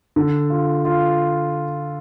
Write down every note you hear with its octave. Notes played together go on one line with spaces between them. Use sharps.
D3
F4
F4